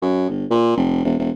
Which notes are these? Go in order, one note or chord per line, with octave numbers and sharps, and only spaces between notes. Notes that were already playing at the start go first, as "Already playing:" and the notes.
F#2
G1
A#2
F1
E1
E1